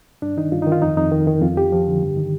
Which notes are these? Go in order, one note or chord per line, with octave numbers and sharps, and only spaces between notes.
G2 D4
D#3 D#4
G2 F4
D#4
D#3
F4
F2 D#4
F2 D#4
D#3
D#3
F2 F4
F3 G4
F3
D3
G2
D#3